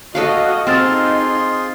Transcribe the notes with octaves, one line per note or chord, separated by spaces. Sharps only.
F#4 A4 C#5 D#5 F5
C4 D#4 F4 G#4 C6 E6 F6 A6